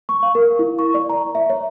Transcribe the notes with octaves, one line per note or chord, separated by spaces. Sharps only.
C#6
F5
A#4
E4
C#6
D5
A#5
E5
C#5